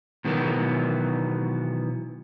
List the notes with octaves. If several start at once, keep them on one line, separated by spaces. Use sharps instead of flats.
B2 D#3 E3 F#3 A#3 B3